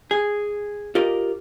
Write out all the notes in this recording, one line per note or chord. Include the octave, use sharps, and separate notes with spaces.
G#4
F4 G4 A#4 D#5